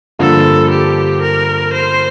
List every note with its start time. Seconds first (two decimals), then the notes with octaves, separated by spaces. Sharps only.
0.19 G2 D3 F3 A#3 F4 A4
0.70 G4
1.22 A#4
1.73 C5